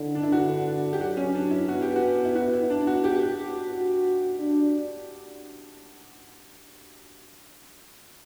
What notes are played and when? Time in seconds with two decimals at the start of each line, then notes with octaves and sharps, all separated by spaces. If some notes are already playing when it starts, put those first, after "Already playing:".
Already playing: D3 E4
0.15 D4
0.23 E4
0.32 D3 F#4
0.93 G4
1.01 F#3 F#4
1.17 C#4
1.35 D4
1.51 E4
1.68 B3 F#4
1.82 G4
1.96 F#4
2.25 E4
2.36 F#4
2.53 E4
2.70 D4
2.87 F#4
3.04 F#4 G4
3.20 G4
3.38 F#4
3.72 F#4
4.39 D4